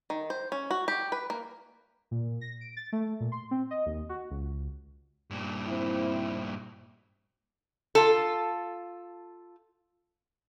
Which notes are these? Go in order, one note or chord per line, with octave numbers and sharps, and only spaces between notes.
D#3
C5
C#4
F#4
G4
B4
A#3
A#2
A#6
D7
A6
A3
A#2
C6
C4
D#5
D#2
F#4
C#2
G2 A#2
C4 E4
F4 A4